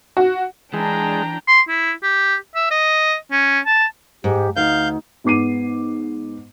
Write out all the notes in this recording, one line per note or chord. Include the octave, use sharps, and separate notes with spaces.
F#4
E3 G#3 D4 G5 A#5
C6
E4
G4
E5
D#5
C#4
A5
G#2 G4
D2 D#4 F5 G6
G#2 B3 D6 C7 D#7